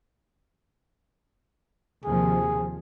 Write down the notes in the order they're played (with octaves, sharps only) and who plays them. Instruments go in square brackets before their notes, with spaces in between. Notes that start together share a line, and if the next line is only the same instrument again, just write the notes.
[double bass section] D#2 C3 F3 [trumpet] G#4